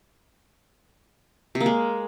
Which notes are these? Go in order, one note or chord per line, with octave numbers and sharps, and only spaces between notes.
C3
A#3
G#3